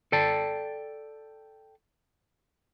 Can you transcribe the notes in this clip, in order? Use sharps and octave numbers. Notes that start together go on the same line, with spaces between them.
A4 D5 G5 A5